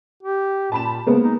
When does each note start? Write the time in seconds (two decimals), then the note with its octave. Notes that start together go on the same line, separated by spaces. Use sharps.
0.23 G4
0.72 A#2 A5 B5 E7
1.06 C#3 G#3 A#3 B3
1.24 D#4